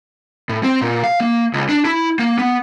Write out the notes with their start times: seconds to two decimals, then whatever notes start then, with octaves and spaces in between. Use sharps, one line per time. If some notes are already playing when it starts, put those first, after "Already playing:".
0.49 A2
0.63 C4
0.82 A#2
1.04 F5
1.20 A#3
1.53 C#2
1.69 D4
1.85 E4
2.19 A#3
2.39 B3